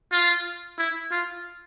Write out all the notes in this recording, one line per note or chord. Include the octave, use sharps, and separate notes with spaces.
F4
E4
F4